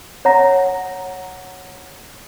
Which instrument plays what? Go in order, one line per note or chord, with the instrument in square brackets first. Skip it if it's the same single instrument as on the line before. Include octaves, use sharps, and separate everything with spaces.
[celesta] C#5 F#5 A#5 A#6